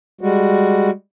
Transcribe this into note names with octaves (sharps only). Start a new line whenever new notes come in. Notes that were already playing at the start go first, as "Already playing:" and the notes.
G3 G#3 F#4